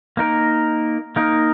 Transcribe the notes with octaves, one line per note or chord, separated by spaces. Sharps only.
A#3 D#4 A#4
A#3 D#4 A#4